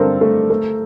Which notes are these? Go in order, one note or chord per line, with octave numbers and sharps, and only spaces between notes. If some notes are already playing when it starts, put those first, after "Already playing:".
Already playing: G2 D3 C4 A4 A#4
A3
A3